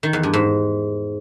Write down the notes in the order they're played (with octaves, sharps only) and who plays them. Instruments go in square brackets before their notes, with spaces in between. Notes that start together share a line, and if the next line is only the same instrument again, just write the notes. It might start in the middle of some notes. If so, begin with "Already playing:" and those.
[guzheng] D#3
E2
G2
G#2